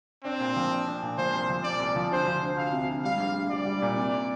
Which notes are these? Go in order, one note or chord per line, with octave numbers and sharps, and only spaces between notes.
C4 D4
A#2
F3
D4
D4
A#2
F3 C5
C2
F3
A#2 D5
C2
F3
D2 C5
F3
D2
D2 F5
C3
D2
G3 F5
A#1
A#1
G3 D5
G3
A#2
C3